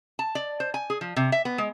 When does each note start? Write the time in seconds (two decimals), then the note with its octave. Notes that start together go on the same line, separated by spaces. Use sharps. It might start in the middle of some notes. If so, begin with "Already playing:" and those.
0.19 A5
0.35 D5
0.60 C5
0.74 G#5
0.90 G#4
1.01 F3
1.16 C3
1.32 E5
1.45 B3
1.58 G#3